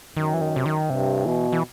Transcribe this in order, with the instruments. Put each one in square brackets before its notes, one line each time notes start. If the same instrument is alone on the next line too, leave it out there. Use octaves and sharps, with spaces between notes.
[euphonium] F#2 [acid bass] D#3
[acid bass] E3
D#3
C3
D#3
[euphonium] G2 [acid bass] C3
[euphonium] B2 [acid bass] E3
[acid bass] E3